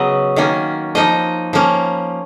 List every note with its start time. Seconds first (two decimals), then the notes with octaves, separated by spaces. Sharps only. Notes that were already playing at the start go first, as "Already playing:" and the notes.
Already playing: C#3 F#3 B3 D#5
0.36 D#3 A#3 C#4
0.95 F3 A#3 D#4 D#5
1.53 F3 A#3 C#4